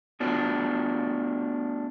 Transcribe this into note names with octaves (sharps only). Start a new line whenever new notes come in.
A3 B3 D4 F4 F#4